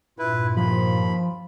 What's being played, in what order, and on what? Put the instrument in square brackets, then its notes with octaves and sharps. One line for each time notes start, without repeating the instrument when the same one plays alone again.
[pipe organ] G2 A#2 F4 [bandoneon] E4 B4
[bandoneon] D#2 B5 [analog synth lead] F3